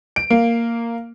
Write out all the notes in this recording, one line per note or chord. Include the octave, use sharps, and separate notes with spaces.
D7
A#3